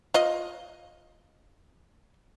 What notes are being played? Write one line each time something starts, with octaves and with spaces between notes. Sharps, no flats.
F4 D#5